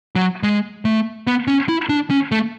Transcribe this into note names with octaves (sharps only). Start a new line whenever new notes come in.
F#3
G#3
A3
B3
C#4
E4
D4
C#4
A3